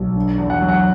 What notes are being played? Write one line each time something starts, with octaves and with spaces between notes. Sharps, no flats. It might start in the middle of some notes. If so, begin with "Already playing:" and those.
Already playing: B1
D3
E2
F#5
F#3
F#5